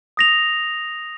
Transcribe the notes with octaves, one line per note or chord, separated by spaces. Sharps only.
D#6 A#6 F7